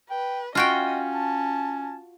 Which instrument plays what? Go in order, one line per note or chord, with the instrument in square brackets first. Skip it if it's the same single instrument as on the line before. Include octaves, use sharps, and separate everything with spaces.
[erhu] B4 [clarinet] G5
[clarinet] C#4 [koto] F4 F#4 G5 [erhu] D#5
[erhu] A5